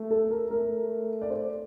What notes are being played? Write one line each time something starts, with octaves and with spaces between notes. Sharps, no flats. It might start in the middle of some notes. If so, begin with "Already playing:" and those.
Already playing: A3
A4
A#4
A3 A#4
D5
C5